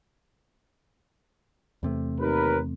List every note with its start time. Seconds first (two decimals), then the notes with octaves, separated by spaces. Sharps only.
1.83 E2 C3 A3
2.19 D#2 A#4 B4